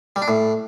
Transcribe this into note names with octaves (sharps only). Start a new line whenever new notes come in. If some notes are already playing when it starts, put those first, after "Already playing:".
G3
D4
A2